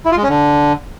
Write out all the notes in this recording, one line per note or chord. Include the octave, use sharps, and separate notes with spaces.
E4
F4
G#3
C#4
D3